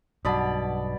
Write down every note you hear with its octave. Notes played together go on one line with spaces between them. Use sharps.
B1 G2 B2 D5 F#5 A5 B5 D#6